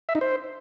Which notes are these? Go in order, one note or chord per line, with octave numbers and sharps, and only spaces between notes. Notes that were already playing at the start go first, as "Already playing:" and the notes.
E5
D#4
C5